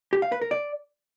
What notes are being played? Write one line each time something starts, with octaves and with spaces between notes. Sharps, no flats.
G4
F5
B4
A#4
D5